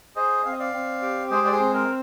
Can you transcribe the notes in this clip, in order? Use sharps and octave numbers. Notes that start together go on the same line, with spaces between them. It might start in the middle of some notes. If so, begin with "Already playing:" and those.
G#4 C5 D#5
C4 F5
D#5
D5 F5
C4
G4
G#3 G#4 C5
D5
G#4 C5
C4
A#4